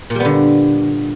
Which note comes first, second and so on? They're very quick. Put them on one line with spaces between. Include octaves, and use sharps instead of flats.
A#2 G3 B3 D3